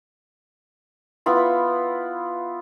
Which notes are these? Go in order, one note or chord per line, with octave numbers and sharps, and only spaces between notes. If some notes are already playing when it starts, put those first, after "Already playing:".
B3 E4 F4 B5